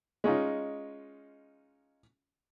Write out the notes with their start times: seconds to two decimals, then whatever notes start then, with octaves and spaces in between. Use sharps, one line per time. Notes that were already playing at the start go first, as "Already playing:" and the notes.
0.24 G#3 C#4 D#4 F4